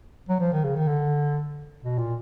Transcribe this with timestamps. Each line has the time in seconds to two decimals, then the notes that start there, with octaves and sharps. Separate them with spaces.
0.29 F#3
0.40 F3
0.52 D#3
0.64 C#3
0.76 D#3
0.88 D3
1.83 B2
1.98 A#2